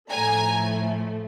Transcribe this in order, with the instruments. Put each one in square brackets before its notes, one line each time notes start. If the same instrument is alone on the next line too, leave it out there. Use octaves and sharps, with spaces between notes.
[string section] A2 F3 A3 G#5 A#5